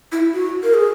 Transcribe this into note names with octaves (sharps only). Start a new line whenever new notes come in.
E4
F#4
A#4
G#4